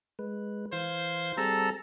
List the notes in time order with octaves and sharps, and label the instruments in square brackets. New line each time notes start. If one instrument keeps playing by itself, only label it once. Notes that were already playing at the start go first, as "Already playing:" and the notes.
[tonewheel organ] G#3 B4
[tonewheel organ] E3 F5 G#6 [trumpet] C5
[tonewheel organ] G3 C4 G#4 [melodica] A4 A5 A#5